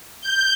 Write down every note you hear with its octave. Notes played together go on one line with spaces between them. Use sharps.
G6